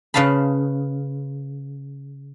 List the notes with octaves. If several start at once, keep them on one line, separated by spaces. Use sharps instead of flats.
C#3 B4 F5 A5 B5